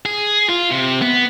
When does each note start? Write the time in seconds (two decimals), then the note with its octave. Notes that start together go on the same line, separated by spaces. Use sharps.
0.06 G#4
0.49 F4
0.71 C3
1.02 B3